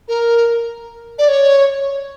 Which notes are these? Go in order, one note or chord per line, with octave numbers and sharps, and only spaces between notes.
A#4
D5
C#5